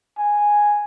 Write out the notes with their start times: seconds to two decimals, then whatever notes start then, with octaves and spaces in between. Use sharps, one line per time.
0.18 G#5